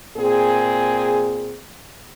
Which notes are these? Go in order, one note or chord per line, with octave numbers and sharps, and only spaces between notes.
A#2 C4 G#4